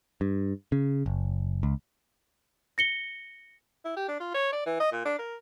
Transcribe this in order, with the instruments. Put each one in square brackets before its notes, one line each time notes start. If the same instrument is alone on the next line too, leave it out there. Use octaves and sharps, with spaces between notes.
[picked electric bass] G2
C#3
F#1
C#2
[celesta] A#6 C#7 G7
[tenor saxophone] E4
G4
D4
F4
C#5
D5
E3
D#5
A#2
D4
A#4